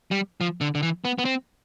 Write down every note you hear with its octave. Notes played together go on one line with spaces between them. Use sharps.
G3
F3
D3
D3
E3
B3
B3
C4